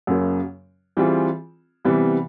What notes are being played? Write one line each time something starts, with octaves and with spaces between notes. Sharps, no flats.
F#2 C#3 F#3 A#3
E3 G3 C4 F4 G#4
C3 E3 G3 B3